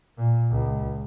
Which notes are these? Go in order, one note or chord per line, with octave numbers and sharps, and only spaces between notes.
A#2
C#2